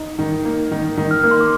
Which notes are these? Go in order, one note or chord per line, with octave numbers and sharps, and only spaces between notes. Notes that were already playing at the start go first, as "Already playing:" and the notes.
Already playing: D#4
D#3
A#3
D#3
D#3
F6
A#3
C6
D6